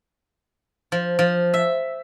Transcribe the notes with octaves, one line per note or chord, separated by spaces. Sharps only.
F3
F3
E5